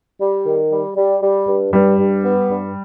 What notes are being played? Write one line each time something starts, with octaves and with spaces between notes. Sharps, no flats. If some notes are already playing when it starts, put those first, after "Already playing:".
G3
D#3
G3
G3
G3
G2
G2 G3
G2
B3
G2